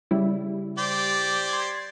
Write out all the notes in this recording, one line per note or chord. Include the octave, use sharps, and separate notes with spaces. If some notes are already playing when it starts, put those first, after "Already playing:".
C#3 G3 E4
G4 C5 D5
C6 G#6